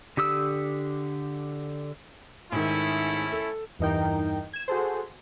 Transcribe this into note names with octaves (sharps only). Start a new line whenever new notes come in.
D3 G4 D#6 E6
G#2 D#3 A3 C#4 E4
A4
E2 G2 E3 D#4 A#4 G5
G#6 E7
F#4 G#4 A4 C5